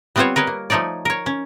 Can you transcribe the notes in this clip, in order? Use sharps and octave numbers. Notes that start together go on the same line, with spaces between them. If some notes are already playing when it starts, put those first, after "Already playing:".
G3 B3 C4 F4 C5 C#5
A#4 B4 C#5 D#5
A#3
F3 A3 D#4 C#5 D5
A#4 C#5
C#4